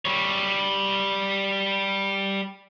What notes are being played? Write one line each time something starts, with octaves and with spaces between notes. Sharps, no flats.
G3 C#5